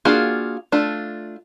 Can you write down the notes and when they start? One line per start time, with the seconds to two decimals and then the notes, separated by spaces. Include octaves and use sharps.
0.05 A#3 D4 F4 F#4 G#4
0.72 A3 D4 F4